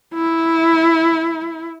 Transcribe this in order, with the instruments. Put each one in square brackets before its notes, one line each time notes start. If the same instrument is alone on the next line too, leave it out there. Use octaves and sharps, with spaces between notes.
[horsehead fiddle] E4